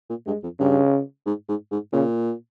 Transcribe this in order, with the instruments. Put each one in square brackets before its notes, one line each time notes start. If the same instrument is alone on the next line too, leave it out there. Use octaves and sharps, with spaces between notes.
[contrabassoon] A#2
[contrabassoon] G2 [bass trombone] G#3
[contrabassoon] F2
[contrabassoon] G2 [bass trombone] C#3
[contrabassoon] G#2
G#2
G#2
[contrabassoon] A#2 [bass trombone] C#3